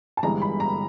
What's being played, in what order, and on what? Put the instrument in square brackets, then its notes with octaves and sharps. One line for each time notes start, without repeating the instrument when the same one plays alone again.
[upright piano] A5
G1 G2 E3 G#3 A#5
B5
A#5